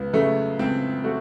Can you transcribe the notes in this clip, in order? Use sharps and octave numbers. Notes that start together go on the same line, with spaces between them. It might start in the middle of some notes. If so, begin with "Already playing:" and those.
Already playing: C#2 B3
C#3 F#3 A3
C#2 C4
A3 F#4